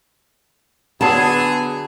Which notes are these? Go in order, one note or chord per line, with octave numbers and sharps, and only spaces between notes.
D3 F#3 B3 G#4 A5